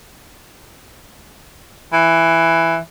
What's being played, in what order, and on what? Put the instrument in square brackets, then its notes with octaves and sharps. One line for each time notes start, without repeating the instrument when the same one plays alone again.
[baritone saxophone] E3